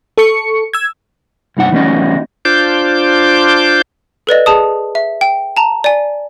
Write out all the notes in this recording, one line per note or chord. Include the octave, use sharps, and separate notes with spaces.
A4 C#6 C#7
E6 G#6
C2 G2 D#4 F#5
E3 G3 A3 C#4 D#4 F#4
D4 F4 C5 D6 G6
A4 B4 D5 D#5
G#4 A5 D#6
E5
G5
A5 A#5
D5 G#5